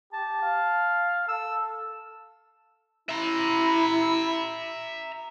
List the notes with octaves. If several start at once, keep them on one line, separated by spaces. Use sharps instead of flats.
G4 A5
F5
A4 E6
E4 E5 A#5